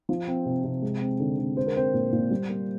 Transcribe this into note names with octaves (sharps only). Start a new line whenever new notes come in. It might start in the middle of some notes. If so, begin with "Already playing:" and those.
F3
C4
C3
C3
G#3
C4
D3
D3
G#3 C5
A#4
C4 C5
A#2
A#2
G3
A#3